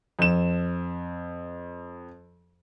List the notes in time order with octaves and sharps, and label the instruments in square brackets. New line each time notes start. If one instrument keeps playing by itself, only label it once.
[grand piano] F2 E7